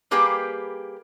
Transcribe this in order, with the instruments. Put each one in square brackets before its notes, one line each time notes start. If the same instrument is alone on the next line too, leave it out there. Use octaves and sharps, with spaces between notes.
[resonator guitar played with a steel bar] G3 A#3 G4 G#4 B4